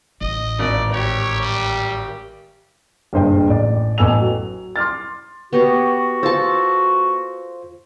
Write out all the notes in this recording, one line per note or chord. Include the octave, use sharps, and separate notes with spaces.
A1 D#5
G#1 D5
G4 C#5
G3
F#1 G2 A#2 C5 D#5 G5
A1 D5
A1 B3 A4 G#5 E6 F7
F#3
C6 D6 F6 A6
B3 F#4 G4 C#5
F4 A4 C5 A5